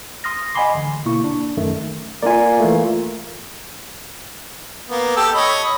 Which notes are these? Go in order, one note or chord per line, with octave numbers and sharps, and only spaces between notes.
C6 D#6 F6 A#6
D#5 F#5 G#5 B5 C6 D6
A1 D3
B2 A#3 E4 C#6
D4
A#1 F#2 D#3 A3
A#3 F4 D5 G#5
E3 A3
A#3 B3
G4 A4 E6
C#5 D#5 B5